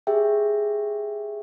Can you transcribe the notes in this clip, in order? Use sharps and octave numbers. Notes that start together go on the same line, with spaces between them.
G4 G#4 E5 G5